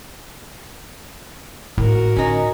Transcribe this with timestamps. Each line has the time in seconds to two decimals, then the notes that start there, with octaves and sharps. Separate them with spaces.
1.78 G#1 A2 E4 F#4 A#4
2.16 D2 C#4 D#4